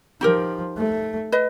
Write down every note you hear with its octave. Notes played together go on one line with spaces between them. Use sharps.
F3 D#4 G4 A#4
A3
B4 D#5